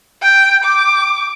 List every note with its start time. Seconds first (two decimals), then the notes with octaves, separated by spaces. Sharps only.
0.22 G5
0.64 D6